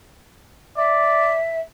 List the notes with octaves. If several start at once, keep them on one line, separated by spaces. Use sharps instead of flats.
D5 E5